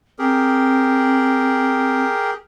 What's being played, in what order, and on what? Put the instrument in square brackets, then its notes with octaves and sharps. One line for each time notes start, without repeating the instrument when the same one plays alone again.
[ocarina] C4 [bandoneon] G4 G#4 A#4